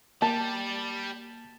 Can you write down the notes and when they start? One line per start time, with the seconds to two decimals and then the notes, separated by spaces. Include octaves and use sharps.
0.22 G3 A#3 A5